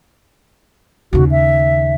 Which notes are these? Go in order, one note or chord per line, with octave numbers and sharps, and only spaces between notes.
D#2 C#3 F#4
E5